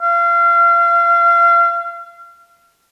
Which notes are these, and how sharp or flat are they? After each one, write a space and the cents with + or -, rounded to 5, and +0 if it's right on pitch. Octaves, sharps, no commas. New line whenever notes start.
F5 -30